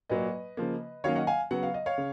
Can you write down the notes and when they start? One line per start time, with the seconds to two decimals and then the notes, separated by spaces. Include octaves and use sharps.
0.10 A#2 F#3 A#3 B4 D#5
0.57 C#3 F3 A#3
1.04 D#3 F#3 A#3 C#4 C#5 F5
1.16 D#5 F#5
1.27 F5 G#5
1.51 C#3 F#3 B3 F#5
1.63 F5
1.74 D#5
1.86 C#5 F5
1.98 C#3